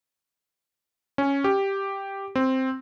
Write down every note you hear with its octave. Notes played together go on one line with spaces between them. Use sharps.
C#4
G4
C4